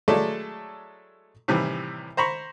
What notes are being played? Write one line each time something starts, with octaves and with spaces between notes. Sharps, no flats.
F#3 G#3 A3 E4 A4 D5
A2 C3 D#3 E3 G3
C5 A#5 B5 C#6